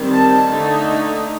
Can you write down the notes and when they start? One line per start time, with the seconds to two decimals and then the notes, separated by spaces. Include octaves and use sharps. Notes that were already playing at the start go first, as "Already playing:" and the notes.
Already playing: D#3 G3 C4
0.13 A5
0.49 D3 A3 D#4